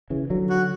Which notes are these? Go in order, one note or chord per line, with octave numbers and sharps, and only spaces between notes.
C#3 E3
D3 F#3
F#4